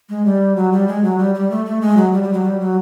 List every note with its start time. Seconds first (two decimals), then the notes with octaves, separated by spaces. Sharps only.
0.09 G#3
0.25 G3
0.56 F#3
0.72 G3
0.88 G#3
1.03 F#3
1.19 G3
1.35 G3
1.51 A3
1.66 A3
1.81 G#3
1.97 F#3
2.13 G3
2.23 G3
2.33 F#3
2.44 G3
2.60 F#3